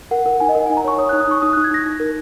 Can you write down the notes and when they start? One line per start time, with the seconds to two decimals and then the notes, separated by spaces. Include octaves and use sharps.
0.11 A#4 F#5
0.26 A#4 F#5
0.40 D#4 G#5
0.49 D#5
0.55 A#4 F#5
0.66 D#4 G#5
0.77 A#5
0.84 C#5 C#6
0.99 C#5 D#6
1.09 D#4 F#6
1.20 D#6
1.27 D#4 C#6
1.42 D#4 D#6
1.53 D#4 F#6
1.64 G#6
1.71 D#4 A#6
1.86 D#4
2.00 A#4